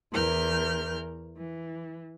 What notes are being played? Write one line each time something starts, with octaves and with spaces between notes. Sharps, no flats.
E2 E3 A#4 F6 G6
E3